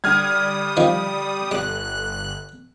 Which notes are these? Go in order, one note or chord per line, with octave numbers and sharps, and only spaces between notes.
D3 G3 D#6 F6 G#6
D#3 F3
G1 G3 F#6